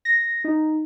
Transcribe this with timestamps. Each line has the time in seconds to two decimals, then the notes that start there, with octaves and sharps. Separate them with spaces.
0.05 A#6
0.44 D#4